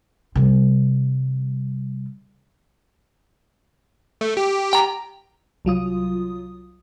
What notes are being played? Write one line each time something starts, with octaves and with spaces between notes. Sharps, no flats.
C3 G3
A3
G4
G5 A#5
C2 F#3 F4 D#6